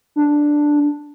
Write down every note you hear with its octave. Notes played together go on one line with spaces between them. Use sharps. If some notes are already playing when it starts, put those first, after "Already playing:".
D4